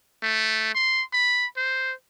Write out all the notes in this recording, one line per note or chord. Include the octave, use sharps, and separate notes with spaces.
A3
C6
B5
C5